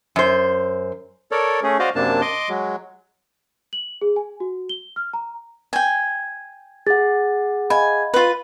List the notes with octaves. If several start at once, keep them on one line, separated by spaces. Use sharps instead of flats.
F#2 C5
A4 A#4 C#5 D5
A3 C#4 G#4
F#4 C5 D5 D#5 F5
F#2 C3 A#3 D4 A5
D#5 C6 D6
F#3 G#3
F#7
G#4
G#5
F#4
G7
F6
A#5
G5 G#5
G#4 F#5 A6
D#5 F5 G#5 B5
F4 B4